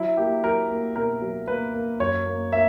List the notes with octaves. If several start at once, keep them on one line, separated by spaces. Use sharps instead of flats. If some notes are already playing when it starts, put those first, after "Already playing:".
Already playing: F#3 E4
A#3 G4
F#3 A#4
A#3
B2 A#4
F#3
A#3 B4
A#3
F#2 C#5
A#3
A#3 E5